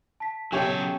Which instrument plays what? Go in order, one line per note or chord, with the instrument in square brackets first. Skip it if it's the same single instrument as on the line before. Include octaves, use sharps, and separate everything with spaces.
[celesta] A5 B6
[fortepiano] B2 E5 G5 [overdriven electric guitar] F#3 A4 [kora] C#4 G4 C#5